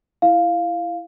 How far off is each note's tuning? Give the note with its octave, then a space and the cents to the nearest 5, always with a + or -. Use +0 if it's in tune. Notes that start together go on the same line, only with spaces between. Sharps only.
E4 +15 F5 +0